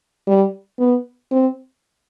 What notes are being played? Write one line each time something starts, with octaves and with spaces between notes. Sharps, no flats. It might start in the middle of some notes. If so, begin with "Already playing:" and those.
G3
B3
C4